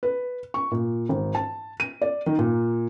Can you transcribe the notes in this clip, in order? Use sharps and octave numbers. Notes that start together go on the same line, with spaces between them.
B4
C#6
A#2
G#1
A5
D#7
D5
D#3
A#2